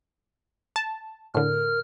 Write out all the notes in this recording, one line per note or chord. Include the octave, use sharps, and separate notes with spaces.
A5
A2 D3 A#4 F6